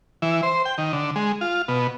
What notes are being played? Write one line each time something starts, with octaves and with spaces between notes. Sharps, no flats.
E3
C5
G5
D#3
D3
G#3
F4
B2